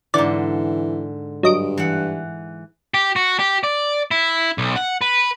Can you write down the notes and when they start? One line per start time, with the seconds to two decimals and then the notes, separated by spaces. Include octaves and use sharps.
0.14 G#2 D3 E3 D5
1.43 G2 F#3 D#5 D7
1.78 E3 F#5
2.94 G4
3.16 F#4
3.39 G4
3.64 D5
4.11 E4
4.58 B1
4.76 F#5
5.01 B4